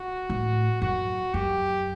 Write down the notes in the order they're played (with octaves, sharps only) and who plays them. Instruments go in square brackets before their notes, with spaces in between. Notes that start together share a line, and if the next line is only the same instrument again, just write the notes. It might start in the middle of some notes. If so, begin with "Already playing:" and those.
Already playing: [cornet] F#4
[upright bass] A2
[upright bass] F#2 [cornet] F#4
[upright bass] F#2 [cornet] G4